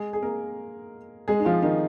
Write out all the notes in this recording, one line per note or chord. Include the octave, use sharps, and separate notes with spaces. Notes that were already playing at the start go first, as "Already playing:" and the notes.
Already playing: G#3 G#4
G#4
A#3 A#4
G#3 G#4
D#4
F3 F4
D#3 D#4